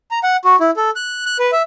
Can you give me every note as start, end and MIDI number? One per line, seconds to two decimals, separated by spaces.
0.11 0.19 82
0.23 0.37 78
0.45 0.56 66
0.60 0.71 64
0.77 0.90 69
0.96 1.25 90
1.26 1.37 90
1.39 1.51 71
1.52 1.62 76